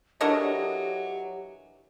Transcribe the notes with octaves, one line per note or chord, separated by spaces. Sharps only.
E3 F#3 D4 G4 A4 A#4 C#5 D#5